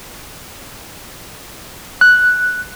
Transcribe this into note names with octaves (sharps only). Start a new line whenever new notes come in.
F#6